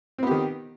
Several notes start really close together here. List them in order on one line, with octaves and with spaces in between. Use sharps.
C4 B3 G4 D#3